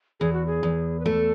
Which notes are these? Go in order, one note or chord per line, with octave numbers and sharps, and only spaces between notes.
E2 G#4
F#4
G#4
E2
B4
A3 A4